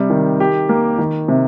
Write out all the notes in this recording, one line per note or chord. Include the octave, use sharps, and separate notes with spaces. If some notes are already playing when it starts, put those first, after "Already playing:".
Already playing: C3 G3
D#3
G4
A#3
D#3
C3